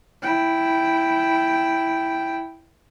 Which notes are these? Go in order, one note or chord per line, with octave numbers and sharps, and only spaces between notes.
E4 G5